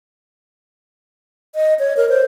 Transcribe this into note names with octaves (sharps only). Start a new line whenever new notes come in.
D#5
C#5
A#4
C5